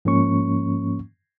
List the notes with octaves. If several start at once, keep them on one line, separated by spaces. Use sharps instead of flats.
G#2 F3 A#3 C#4 C#6